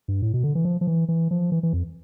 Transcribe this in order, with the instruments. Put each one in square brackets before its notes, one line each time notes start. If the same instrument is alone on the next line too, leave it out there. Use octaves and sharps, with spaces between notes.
[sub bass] G2
A2
B2
D3
E3
F3
F3
E3
E3
F3
E3
E3
F2